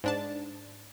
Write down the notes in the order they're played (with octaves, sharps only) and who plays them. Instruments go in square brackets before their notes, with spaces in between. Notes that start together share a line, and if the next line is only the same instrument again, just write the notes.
[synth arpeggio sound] G#2 D4 A5